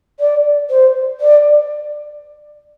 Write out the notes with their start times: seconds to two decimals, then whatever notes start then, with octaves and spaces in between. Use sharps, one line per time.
0.20 D5
0.70 C5
1.20 D5